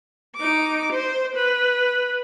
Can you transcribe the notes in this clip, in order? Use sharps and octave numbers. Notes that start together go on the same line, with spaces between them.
D#4 D6
C5
B4